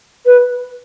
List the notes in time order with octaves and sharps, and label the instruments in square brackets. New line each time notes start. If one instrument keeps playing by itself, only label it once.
[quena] B4